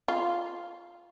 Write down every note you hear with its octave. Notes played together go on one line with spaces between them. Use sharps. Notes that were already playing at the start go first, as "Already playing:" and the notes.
F4